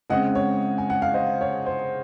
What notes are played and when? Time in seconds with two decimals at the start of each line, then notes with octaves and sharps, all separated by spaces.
0.10 C#3 G#3 C4 D#5 F#5
0.35 C#5
0.78 G#5
0.90 F#5
1.02 F5
1.14 C5 D#5
1.41 C#5
1.66 C5